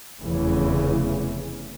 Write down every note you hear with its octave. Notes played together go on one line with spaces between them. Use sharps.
F1 E2 C#3 E3